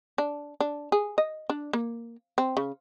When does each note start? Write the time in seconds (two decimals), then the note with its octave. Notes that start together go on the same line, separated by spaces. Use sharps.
0.18 D4
0.60 D4
0.92 G#4
1.18 D#5
1.50 D4
1.73 A#3
2.38 C4
2.57 C#3